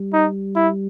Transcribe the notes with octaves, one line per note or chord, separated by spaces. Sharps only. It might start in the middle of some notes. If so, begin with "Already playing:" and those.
Already playing: G3
D#4
E4